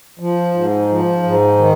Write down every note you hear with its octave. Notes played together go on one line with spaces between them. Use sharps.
F3
G#2
F3
G#2
D#3